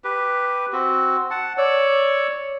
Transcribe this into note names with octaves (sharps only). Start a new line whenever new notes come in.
G4 B4
C4 F#4
F#5 A5
C#5 D5 E6